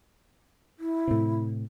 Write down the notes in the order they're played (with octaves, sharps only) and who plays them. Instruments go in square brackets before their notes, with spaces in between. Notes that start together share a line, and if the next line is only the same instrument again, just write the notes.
[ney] E4
[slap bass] A2 C3